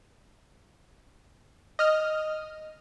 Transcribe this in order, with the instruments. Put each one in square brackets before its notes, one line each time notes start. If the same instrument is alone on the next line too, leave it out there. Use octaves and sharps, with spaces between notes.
[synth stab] D#5 F6